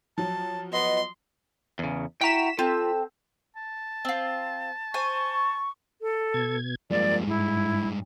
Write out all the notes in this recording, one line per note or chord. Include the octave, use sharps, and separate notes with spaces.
F3 F#3 A5
B3 D#5 C6
E2 C#3
E4 F#4 G5 A#5 B6 E7
C4 F4 A4
A5
C4 F4
C5 G#5 C#6
A4
B2 G#6
G2 F3 G#3 A#3 D5
G#2 E4